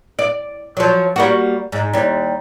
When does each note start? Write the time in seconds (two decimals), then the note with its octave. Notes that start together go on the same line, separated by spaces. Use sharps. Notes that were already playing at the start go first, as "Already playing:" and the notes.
0.19 D5
0.77 F3 F#3
1.16 G3 A#3 F#4
1.72 G#2
1.94 D#2 G3